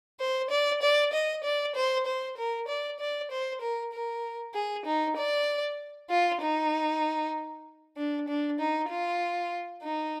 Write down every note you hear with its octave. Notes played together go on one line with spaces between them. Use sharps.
C5
D5
D5
D#5
D5
C5
C5
A#4
D5
D5
C5
A#4
A#4
G#4
D#4
D5
F4
D#4
D4
D4
D#4
F4
D#4